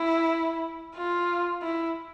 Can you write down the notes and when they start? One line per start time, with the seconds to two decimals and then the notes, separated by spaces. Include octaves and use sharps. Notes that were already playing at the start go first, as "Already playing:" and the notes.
Already playing: E4
0.96 F4
1.62 E4